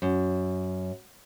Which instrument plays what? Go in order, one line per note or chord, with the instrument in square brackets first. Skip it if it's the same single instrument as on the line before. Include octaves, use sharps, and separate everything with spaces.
[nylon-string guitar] F#2